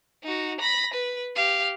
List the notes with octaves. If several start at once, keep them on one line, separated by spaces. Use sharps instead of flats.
D#4 F#4
B5 A#6
B4
G4 F5